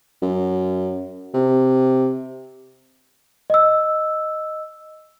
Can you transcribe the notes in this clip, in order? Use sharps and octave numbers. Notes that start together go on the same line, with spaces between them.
F#2
C3
D#5 E6